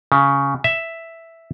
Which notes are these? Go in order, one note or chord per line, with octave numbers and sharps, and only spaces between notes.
C#3
E5